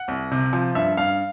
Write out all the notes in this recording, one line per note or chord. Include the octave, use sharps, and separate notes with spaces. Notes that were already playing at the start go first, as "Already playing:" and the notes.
Already playing: F#5
C2
C3
F3
G2 E5
G2 F5